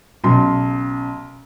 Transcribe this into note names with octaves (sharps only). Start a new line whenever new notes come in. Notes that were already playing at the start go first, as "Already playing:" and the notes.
B1 C#3 C6